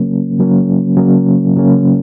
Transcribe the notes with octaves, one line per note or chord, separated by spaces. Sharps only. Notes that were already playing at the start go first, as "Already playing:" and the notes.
Already playing: C#3 F#3 A#3 C#4
C#3 F#3 A#3 C#4
C#3 F#3 A#3 C#4
C#3 F#3 A#3 C#4